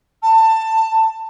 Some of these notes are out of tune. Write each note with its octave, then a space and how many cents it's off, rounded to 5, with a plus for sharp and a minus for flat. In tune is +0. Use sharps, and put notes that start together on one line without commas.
A5 +20